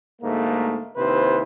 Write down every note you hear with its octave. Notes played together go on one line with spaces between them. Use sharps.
D2 G#2 A3 A#3
D#2 C3 E4 B4 C5